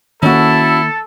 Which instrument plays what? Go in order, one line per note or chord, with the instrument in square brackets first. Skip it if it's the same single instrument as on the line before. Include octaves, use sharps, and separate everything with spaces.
[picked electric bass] D#3 A#3 [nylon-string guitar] C#4 F#4 [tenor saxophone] E4 [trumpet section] A4